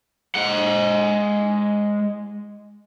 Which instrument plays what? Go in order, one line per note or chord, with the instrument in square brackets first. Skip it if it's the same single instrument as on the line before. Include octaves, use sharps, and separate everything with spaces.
[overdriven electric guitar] G#3 F#5